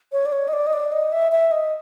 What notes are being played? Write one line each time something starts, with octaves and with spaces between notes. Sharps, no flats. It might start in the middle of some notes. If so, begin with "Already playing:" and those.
C#5
D5
C#5
D#5
D5
D#5
D5
D#5
E5
E5
D#5